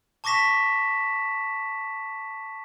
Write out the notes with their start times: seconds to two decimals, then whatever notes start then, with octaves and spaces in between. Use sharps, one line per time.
0.24 A5 C#6 D6 A#6 B6 E7